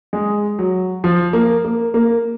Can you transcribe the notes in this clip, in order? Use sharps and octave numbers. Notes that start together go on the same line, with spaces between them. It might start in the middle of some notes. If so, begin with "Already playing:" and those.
G#3
F#3
F3
A#3
A#3
A#3